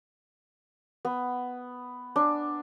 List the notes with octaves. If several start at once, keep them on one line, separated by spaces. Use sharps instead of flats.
B3
D4